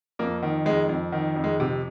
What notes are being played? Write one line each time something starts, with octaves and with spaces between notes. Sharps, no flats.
F2 A#3
D#3
F2 G#3
F2
D#3
F2
G#3
C3